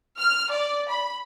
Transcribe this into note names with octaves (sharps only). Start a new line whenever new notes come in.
F6
D5
B5